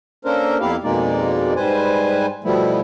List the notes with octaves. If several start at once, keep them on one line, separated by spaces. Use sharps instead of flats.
A#3 C#4 D4 A4 A#4 C5
F2 A#3 B3 E4 G4 F5
F2 B2 G#3 A#3 D#4 D5
G#2 G3 B4 C5 G#5
B2 F3 G3 A3 B3 E4